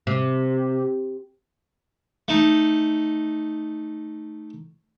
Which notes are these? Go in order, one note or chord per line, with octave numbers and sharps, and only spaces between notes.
C3
A3 D#4